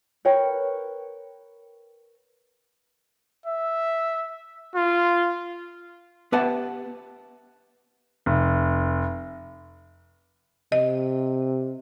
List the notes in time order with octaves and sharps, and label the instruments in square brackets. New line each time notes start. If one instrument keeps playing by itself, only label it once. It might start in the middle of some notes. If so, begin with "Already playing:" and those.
[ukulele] A#4 B4 C#5 G5
[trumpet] E5
F4
[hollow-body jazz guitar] B3 G4 B4 E5 F#5 A5
[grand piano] F1
[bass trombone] C3 [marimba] D#5